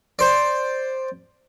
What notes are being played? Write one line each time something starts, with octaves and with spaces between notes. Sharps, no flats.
C5 D5